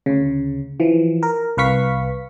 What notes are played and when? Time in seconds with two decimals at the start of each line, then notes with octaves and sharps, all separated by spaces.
0.06 D2 C#3
0.80 E3 F3
1.23 A#4
1.57 C2 B4 F5 C#6 B6